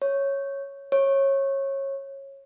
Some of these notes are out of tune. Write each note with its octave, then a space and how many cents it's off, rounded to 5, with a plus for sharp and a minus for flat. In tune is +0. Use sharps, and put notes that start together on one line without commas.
C#5 -5
C#5 -20